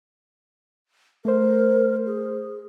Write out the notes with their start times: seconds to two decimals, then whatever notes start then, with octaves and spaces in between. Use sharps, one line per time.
1.25 A3 A#4 C5
2.06 G#4